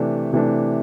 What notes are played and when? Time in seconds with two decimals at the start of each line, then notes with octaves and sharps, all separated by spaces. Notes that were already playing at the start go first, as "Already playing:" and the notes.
Already playing: C3 E3 A3 D4
0.33 C3 E3 A3 D4